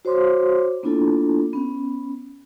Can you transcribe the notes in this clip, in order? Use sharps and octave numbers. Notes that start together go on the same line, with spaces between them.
F#4 C5 C#5 C6 D6
A#3 B3 D4 E4 F4 A4
B3 C#4